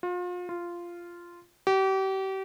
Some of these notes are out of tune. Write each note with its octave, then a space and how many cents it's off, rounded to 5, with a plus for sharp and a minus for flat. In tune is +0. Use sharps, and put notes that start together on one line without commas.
F4 +35
F4 -10
G4 -35